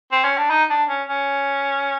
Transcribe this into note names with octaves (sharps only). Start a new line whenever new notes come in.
C4
C#4
D4
D#4
D4
C#4
C#4